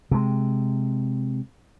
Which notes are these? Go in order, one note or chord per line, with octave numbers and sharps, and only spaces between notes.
C3 G#3